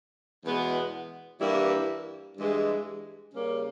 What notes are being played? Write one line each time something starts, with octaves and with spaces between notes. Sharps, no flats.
E2 B2 G#3 B3
G2 E3 G3 A#3 E4
G2 E3 G#3
C#3 G3 A#3 C#4